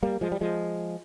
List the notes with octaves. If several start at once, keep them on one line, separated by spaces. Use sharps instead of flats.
G3 A#3
F3 G#3
G3
F3 G#3